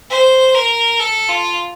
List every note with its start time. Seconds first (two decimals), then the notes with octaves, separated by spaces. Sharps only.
0.10 C5
0.55 A#4
1.00 A4
1.29 F4